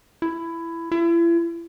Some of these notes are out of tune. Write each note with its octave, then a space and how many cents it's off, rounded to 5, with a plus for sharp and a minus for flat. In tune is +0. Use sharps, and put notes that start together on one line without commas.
E4 +15
E4 +40